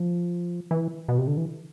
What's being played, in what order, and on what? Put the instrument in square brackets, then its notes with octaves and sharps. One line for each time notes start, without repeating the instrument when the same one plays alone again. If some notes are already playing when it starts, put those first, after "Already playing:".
Already playing: [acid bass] F3
E3
B2
C3
D3
E3